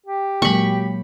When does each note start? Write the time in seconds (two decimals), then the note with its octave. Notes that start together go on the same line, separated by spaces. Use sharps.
0.06 G4
0.42 A#2 F#3 G#3 A#3 B5 C#6